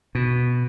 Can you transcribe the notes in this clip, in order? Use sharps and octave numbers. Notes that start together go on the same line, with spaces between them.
B2